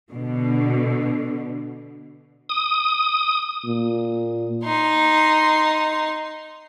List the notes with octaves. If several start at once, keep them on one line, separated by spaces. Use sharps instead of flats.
B2 D3
D#6
A#2
D#4 C6